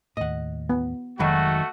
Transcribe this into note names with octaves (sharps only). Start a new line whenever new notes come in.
D#2 A2 D#5 F#5
B3
F1 D#3 F#3 G#3 A3 F#4 B5